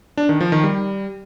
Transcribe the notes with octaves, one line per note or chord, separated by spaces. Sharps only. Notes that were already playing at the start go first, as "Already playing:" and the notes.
D4
D#3
F3
D#3
G3